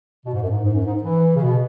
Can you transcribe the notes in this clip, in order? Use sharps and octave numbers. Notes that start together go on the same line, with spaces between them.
B2
G#2
F#2
G#2
G#2
F#2
G#2
E3
C#3
B2